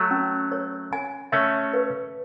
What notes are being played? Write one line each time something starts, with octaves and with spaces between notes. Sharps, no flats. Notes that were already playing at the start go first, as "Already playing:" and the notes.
Already playing: F#3 A3
C#4
C#5
G#5
A3 C#4 E5
B4